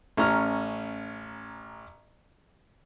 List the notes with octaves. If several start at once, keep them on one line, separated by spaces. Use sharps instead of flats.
A1 C#4 A#5 F6